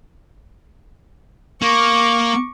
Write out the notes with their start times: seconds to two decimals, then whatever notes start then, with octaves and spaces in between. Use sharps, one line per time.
1.62 A#3 C#6 D6